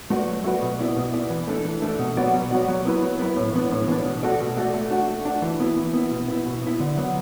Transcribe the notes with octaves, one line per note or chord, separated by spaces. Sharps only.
A3 F#4 B4 D5
F#3
A3 F#4 B4 D5
B2
B3 E4 D5
B2
B3 E4 D5
E3
A3 D4 A4
E3
A3 D4 A4
B2
F#3 B3 F#4 D5
B2
F#3 B3 F#4 D5
F#3
B3 E4 B4
F#3
B3 E4 B4
A2
E3 B3 D4
A2
E3 B3 D4
B2
A3 F#4 A4 D5
B2
A3 F#4 A4 D5
A3
D4 F#4
A3
D4 F#4
E3
B3 E4
E3
B3 E4
B2
B3 E4
B2
B3 E4
D3
F#3 B3